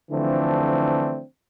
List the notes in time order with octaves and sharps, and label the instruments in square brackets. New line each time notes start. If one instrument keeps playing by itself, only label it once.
[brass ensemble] D3 E3 F3 A3 C4 D4